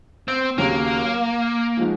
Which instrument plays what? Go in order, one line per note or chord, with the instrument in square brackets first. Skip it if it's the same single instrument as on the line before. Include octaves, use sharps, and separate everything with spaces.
[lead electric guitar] C4
[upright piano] D#2 C#3 F#3 [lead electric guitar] A#3
[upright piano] F3 G#3 D#4 F#4